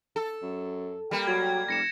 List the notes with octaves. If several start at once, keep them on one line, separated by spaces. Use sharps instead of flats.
A4
F#2
G3 A#3
F#3 G#6
F1 A#6 C#7 E7